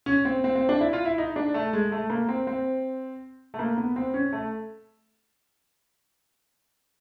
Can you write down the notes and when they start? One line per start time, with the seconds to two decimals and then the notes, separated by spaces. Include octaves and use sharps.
0.06 C#4
0.25 C4
0.44 C4
0.55 C4
0.69 D4
0.80 E4
0.93 F4
1.05 E4
1.18 D#4
1.36 D4
1.54 A3
1.73 G#3
1.92 A3
2.10 A#3
2.28 C4
2.47 C4
3.54 A3
3.59 A#3
3.77 B3
3.96 C4
4.14 C#4
4.33 A3